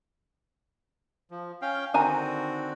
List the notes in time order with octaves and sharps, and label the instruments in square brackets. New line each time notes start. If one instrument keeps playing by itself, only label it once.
[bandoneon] F3
C#4 F5 G5
[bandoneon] D3 C4 F#4 [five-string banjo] D#3 G#5 A#5